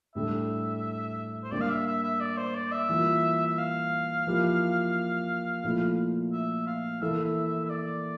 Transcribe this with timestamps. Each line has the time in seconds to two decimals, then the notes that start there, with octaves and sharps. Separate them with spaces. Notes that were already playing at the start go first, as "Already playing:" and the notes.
0.15 A2 G3 D4 A4 E5
1.44 C5
1.52 G3 A#3 D4 D5
1.61 F5
1.69 E5
1.86 E5
2.03 E5
2.21 D5
2.38 C5
2.55 D5
2.72 E5
2.89 E3 G3 A#3 F4
3.47 E5
3.58 F5
4.27 F3 A#3 E4 G4
5.64 A#2 F3 A3 E4 A4
6.33 E5
6.67 F5
7.01 E3 A#3 E4 A4 E5
7.24 E5
7.47 E5
7.65 E5
7.70 D5